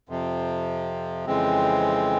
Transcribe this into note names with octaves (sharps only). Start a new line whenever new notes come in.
F2 C3 F3
F2 C#3 E3 G#3 C4